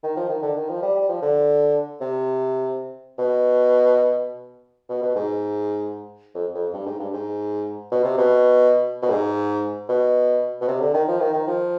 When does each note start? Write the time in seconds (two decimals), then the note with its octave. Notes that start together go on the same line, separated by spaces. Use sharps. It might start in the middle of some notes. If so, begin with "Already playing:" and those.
0.03 D#3
0.17 F3
0.29 D#3
0.42 D3
0.56 D#3
0.69 F3
0.82 G3
0.95 G3
1.09 F3
1.22 D3
2.01 C3
3.18 B2
4.89 B2
5.02 B2
5.16 G#2
6.35 F2
6.55 F2
6.73 G2
6.86 G#2
6.99 G2
7.13 G#2
7.91 B2
8.04 C3
8.18 B2
9.02 B2
9.10 G#2
9.89 B2
10.61 B2
10.68 C3
10.80 D3
10.94 D#3
11.08 F3
11.20 D#3
11.34 D#3
11.47 F3